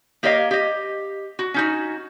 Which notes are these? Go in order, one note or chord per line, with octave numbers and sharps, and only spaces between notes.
A#3 G4 A#4 C#5 D#5 F5
G4 D#5
F#4
C#4 D#4 F#4